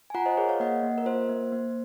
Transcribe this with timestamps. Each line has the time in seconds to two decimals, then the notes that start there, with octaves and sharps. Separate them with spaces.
0.10 G#5
0.14 F4 F#5 A#5
0.26 C5 D#5
0.37 G#4 A#4 C#5
0.49 C#5 F5
0.60 A#3 D#5 F#5
0.83 A#3
0.98 A#4
1.06 F4 C5
1.29 A#3
1.52 A#3